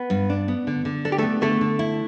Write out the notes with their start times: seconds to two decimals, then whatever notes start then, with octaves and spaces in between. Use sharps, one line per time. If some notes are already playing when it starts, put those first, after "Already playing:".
Already playing: B3
0.10 G2
0.30 D4
0.48 B3
0.67 D3
0.85 D3
1.05 D4 A4
1.12 G4
1.18 A3 B3 A4
1.42 D3 A3 A4
1.61 D3
1.79 E4